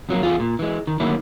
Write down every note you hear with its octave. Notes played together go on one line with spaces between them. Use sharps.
F2 F#3 A#3
E2 F4 G#4
A#2
E3 G#3
D#3
D3 D#3 F#3 A3 A#3 E4